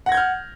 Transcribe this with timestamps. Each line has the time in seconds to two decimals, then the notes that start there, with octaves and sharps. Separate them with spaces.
0.06 F#5
0.09 A#6
0.12 G#6
0.14 G6
0.17 F6